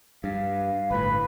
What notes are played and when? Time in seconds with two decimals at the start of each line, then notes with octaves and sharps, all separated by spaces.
0.24 G2 F5
0.91 G1 A2 B4